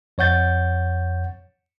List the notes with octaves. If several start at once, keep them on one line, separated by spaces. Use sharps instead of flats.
F2 C#5 F#5 G6 A6